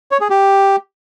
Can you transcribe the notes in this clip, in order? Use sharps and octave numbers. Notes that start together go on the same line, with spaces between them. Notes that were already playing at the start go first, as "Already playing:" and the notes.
C#5
G#4
G4